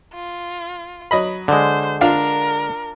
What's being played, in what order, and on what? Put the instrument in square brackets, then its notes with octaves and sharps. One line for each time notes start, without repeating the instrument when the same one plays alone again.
[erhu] F4
[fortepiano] F#3 D#5 B5
[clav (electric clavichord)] D3 G#3 [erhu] C5
[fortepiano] D4 F4 F5 [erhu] A#4